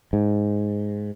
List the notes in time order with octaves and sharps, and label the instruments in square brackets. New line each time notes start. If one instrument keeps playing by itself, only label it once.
[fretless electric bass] G#2